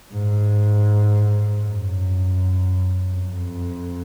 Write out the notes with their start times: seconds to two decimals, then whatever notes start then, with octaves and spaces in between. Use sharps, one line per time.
0.13 G#2
1.63 F#2
3.12 F2